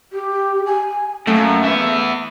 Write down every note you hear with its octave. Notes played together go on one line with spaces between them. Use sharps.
G4
G#5
F#2 A3 A#3
B3 E5